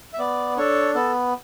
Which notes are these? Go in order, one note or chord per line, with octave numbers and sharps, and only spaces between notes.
E5
B3 D5
D4 A4 C#5
B3 A4